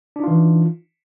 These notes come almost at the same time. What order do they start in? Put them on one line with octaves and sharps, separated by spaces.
D4 D#4 F4 E3